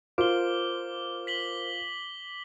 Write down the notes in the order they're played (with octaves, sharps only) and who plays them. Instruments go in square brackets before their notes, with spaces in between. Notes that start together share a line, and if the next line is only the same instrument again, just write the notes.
[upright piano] F4 [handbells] A#4 C5 D7 [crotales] D6 G7
[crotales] B6 F#7 G7